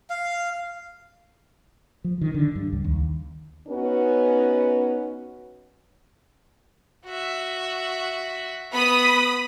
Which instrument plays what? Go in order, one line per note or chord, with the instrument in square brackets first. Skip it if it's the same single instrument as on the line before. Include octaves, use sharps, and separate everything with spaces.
[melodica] F5
[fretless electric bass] F3
D#3
D3
G2
C#2
D#2
[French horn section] B3 C#4 D#4 F#4 B4
[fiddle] F#4 E5
[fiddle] B3 [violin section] B5 D#6